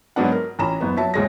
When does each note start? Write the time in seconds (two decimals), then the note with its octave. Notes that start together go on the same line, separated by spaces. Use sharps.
0.16 G#2 F#3 B3 D4 F#5
0.32 A#4
0.59 A1 C#4 A#5 B5 E7
0.81 F#1 B3
0.97 F#3 E5 A5
1.14 D#1 G#2 G#3 C#5 A#6